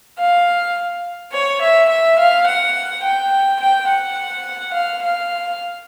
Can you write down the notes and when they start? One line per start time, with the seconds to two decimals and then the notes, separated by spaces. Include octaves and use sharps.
0.19 F5
1.33 C#5
1.61 E5
1.89 E5
2.19 F5
2.47 F#5
3.03 G5
3.60 G5
3.89 F#5
4.74 F5
5.02 F5